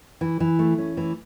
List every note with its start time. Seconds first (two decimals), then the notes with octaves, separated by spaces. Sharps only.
0.21 E3
0.40 E3
0.59 A3
0.78 C#4
0.97 E3